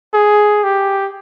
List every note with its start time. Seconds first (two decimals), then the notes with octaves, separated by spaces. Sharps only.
0.14 G#4
0.64 G4